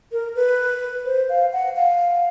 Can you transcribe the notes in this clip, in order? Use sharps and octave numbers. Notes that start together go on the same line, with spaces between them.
A#4
B4
C5
F5
F#5
F5